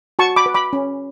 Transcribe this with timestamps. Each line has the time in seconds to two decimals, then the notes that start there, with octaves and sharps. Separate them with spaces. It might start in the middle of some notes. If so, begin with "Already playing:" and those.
0.19 F#4 A5 C#6
0.36 B5 D6
0.46 B4
0.54 B5 D6
0.73 C#4